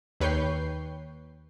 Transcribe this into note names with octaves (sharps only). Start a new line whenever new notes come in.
D#2 B4 C#5 G5 G6 C7